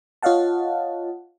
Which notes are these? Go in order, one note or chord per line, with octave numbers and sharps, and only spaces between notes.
F4 C#5 D#5 F5 F#5 A5